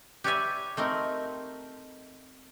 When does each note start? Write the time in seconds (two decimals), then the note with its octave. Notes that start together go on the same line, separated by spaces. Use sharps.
0.24 G4 B4 C#5 D5 E5 G#5
0.77 A3 C4 D#4 A#4